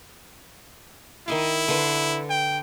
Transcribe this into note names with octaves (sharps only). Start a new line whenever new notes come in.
D#3 E4 D#5 F5
D3 B4 C6
G5